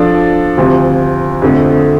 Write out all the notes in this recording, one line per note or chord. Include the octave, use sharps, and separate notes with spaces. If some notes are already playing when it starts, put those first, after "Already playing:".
Already playing: F3 D4 A4 D5
D2 C3 F3
F2 D3 A3